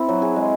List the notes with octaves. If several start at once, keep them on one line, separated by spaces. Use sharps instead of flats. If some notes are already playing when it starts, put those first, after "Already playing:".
Already playing: C4 E4
F#3
G#4
G#3